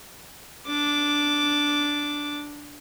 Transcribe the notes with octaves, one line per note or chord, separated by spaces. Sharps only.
D4 D6